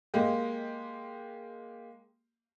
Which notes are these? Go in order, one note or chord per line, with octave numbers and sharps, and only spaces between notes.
G#3 A#3 G4